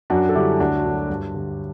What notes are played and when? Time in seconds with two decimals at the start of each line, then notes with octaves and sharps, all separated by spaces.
0.10 F#2 D4 F#4
0.29 A4
0.35 D3 G3 E4 G4
0.60 D2 D4 F#4
0.85 D3 F#3
1.09 G2
1.34 D3 G3